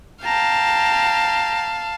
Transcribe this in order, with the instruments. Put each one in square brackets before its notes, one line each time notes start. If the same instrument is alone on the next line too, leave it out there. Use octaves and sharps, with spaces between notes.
[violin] F5 A5 [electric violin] G5 A#5